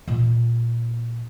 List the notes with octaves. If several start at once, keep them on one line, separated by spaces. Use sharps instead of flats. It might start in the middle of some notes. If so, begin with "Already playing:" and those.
A#2 B3